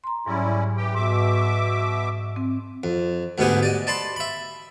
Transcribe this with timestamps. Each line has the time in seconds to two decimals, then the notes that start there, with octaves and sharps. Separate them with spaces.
0.04 A#5 C6
0.26 G#2 F#3 G3 C#4 E4
0.77 E3 G4 G5
0.95 G#2 B2 E5 D6
2.36 C4
2.84 F2
3.38 D2 G#2 B2 B3 G4 G#4
3.63 D5 D#5
3.87 D5 A5 B5 C6
4.16 E5 B5